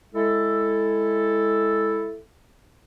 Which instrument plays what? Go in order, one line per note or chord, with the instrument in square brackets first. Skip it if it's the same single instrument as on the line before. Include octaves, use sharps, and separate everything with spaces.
[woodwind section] G#3 E4 A4